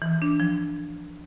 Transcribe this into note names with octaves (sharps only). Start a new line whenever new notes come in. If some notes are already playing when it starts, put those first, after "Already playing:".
E3
D4
F3